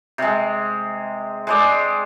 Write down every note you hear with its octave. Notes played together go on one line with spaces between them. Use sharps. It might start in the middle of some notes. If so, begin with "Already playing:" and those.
C3 G#3
G#3 C5 D5